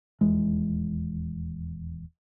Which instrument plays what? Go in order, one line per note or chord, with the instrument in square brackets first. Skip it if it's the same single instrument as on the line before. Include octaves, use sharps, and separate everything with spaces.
[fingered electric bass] D#1 E2 G#3